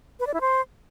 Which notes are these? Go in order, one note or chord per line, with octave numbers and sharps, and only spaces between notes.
B4
D5
E4
C5